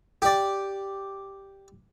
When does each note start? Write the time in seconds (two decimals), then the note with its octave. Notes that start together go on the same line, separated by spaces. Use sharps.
0.22 G4 D5